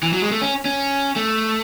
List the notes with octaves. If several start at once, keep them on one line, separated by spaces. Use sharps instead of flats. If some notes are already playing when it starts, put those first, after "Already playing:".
E3
F#3
G#3
A3
C#4
C#4
A3